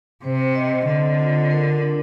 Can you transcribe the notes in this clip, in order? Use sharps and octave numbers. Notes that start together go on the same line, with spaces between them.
C3 C5
D#5
D3 C4
F4
A#4
D4